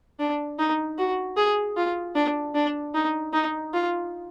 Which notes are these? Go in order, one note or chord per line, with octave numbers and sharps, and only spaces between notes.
D4
D#4
F#4
G#4
F4
D4
D4
D#4
D#4
F4